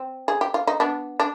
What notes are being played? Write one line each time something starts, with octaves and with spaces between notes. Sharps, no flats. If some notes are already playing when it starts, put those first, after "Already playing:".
Already playing: C4
G#4
G4
F4
D#4
B3 D4
D4